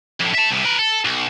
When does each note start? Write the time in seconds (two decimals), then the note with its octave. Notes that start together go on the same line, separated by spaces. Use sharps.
0.20 F2 A2
0.34 E5 A5
0.51 C2 C3
0.64 A#4 B4
0.79 A4
1.05 B1